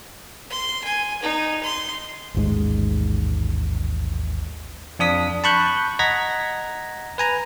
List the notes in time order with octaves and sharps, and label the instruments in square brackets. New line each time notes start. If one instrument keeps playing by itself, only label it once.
[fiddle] C6
G#5
D#4
C6
[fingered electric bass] A1 D#2 G#2 G#3
[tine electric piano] F2 D4 D#6 B6
A5 B5 C#6 F#6 G6
D#5 F#5 A#5 G#6 A#6 B6
B4 G#5 A#5